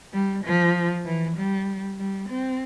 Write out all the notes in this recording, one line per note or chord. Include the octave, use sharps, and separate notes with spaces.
G3
F3
E3
G3
G3
C4